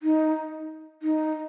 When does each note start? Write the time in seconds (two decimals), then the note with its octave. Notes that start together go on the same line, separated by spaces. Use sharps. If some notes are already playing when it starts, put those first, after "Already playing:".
0.03 D#4
1.02 D#4